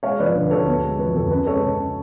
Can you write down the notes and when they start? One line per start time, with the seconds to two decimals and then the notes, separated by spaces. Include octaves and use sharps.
0.03 G#3 C#5 F5
0.19 F3 B4 D5
0.35 D3
0.43 B4
0.51 D2 A4 C#5
0.67 B3
0.83 G#3
0.99 F3 B4
1.15 F2 A4
1.31 C#4 B4
1.46 G#3 A4 C#5
1.63 C#3